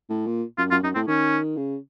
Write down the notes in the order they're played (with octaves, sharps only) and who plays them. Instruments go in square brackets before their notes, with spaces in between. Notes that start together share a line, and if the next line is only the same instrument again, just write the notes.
[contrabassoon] A2
A#2
[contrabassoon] F#2 [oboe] F4
[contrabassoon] F#2 [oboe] F4
[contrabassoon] F#2 [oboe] D#4
[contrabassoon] A2 [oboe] C4
[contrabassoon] D#3 [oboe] C#4
[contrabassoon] C#3